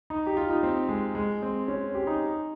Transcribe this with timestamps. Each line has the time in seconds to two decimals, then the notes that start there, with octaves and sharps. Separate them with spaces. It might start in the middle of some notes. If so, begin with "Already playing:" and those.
0.10 D#4
0.26 G4
0.37 F4
0.50 D#4
0.63 C4
0.89 G#3
1.15 G#3
1.42 C4
1.68 C#4
1.95 G4
2.07 D#4